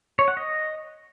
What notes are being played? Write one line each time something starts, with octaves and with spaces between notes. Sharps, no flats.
C#5
F#5
D#5